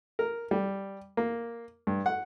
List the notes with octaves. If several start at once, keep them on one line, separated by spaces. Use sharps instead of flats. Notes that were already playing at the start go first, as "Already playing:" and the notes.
A#4
G3
A#3
G2
F#5